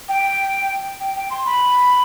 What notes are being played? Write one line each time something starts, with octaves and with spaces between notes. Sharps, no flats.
G5
G5
G5
C6
B5